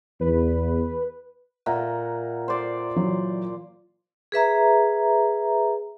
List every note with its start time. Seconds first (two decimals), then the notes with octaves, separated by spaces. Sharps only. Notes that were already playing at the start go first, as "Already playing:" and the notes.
0.20 E2 B4
1.66 A#2 E5 F#5 A#5
2.48 C5 D5
2.96 E3 F#3
4.32 G#4 B4 E5 A#5